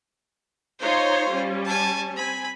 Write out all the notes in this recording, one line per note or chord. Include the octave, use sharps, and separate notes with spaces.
D#4 F4 C5 C#5 C6
G3 C#4
G#5 A5
C4 G#5 B5